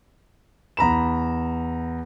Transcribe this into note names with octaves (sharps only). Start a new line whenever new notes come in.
E2 A#5 B5 E7